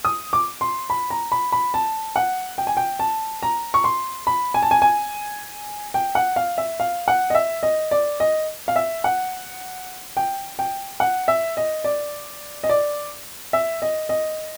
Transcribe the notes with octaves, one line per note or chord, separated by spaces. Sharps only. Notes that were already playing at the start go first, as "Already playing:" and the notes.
D#6
D6
C6
B5
A#5
B5
B5
A5
F#5
G5
G#5
G5
A5
A#5
C#6
C6
B5
G#5
A5
G#5
G#5
G5
F#5
F5
E5
F5
F#5
D#5
E5
D#5
D5
D#5
F5
E5
F#5
G5
G5
F#5
E5
D#5
D5
D#5
D5
E5
D#5
D#5